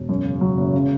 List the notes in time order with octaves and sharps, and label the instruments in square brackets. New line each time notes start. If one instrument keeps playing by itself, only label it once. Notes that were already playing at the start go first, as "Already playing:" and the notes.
Already playing: [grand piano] E1
F#2
C#3
F#3
F#1
C#3